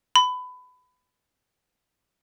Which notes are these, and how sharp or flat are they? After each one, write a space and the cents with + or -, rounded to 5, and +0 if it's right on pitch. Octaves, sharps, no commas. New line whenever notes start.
B5 +20